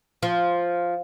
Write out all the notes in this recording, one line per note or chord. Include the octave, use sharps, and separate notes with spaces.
F3